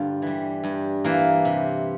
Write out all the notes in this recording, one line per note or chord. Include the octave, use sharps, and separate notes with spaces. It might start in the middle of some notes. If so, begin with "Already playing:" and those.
Already playing: G2 D3 A#3 F4
E3 G3
G2
E3 A#3
C3